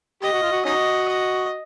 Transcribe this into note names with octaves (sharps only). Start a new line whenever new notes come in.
G4 D#5
F#4
F4
F#4
C#4 D#4 F#4 D#5
D#5